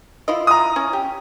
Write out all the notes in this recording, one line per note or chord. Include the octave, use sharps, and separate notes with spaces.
E4 F4 D#5
A#5 D#6
C#4
G4